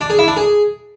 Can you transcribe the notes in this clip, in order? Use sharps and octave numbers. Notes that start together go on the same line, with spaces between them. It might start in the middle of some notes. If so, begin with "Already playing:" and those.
D4
G#4
E4
D4
G#4